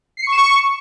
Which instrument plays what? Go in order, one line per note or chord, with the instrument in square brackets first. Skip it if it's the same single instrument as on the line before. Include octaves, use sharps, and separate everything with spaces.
[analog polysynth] C7
C#7
C#6
E7
C#6